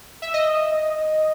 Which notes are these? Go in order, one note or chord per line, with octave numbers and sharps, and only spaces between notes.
E5
D#5